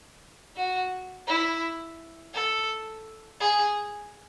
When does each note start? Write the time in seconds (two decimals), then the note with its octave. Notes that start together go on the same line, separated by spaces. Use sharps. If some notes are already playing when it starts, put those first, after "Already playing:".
0.56 F#4
1.27 E4
2.33 A4
3.40 G#4